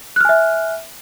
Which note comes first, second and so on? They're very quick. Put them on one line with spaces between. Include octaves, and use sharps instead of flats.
F#6 F6 G#5 E5